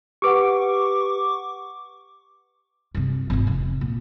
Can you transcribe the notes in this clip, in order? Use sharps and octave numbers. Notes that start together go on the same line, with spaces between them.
G4 B4 F#5 C#6 D6
G2 C3
G#1 F4
F1 E3
A#2